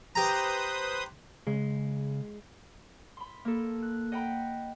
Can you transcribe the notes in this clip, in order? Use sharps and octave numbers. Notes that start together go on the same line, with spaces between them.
G4 B4 C5 A#5 D#6
C#3 G#3
B5 C6
A#3 A4
F#6
D#5 F#5 G5 A#5 B5